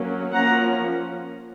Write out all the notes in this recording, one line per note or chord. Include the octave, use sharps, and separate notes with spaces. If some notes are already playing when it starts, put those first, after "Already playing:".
Already playing: F#3 A#3 C#4
F3 A#3 C#4 F#5 A#5